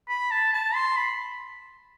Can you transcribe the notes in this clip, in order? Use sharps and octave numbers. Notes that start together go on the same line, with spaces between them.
B5
A5
A5
C6
B5